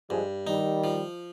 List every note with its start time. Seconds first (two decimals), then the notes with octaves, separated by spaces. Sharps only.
0.10 G2 F3 G#3
0.47 D#3 G3 D#4
0.84 F3